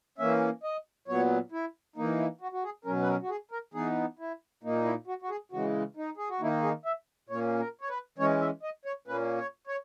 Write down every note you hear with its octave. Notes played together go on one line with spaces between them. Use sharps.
E3 A#3 C#4 E5
D#5
A#2 F#3 B3 C#5
E4
E3 A#3 D#4
E4
F#4
F#4
G#4
B2 F#3 C#4 A#4
B4
A#4
F#4
G#4
A#4
E3 B3 D#4 G#4
E4
A#2 A#3 D#4
E4
F#4
F#4
G#4
C#3 E3 G#3 F#4
D#4
G#4
F#4
D#3 A#3 D#4 E4
G#4
E5
A#2 A#3 C#4 C#5
A#4
C#5
B4
E3 G#3 C#4 C#5
E5
D#5
C#5
A#2 A#3 C#4 B4
C#5
C#5